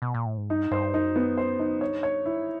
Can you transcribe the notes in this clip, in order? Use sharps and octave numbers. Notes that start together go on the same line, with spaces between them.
B2
A#2
A2
G#2
G2 D#4
G2 C5
F#2 D#4
B3
C5
D#4
G2 C#5
C#5
E4